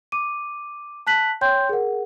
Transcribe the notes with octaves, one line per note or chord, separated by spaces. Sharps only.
D6 D#7
A5 F#6 B6 F#7
C#5 G5 C6 G6
G#4 A#4 F#5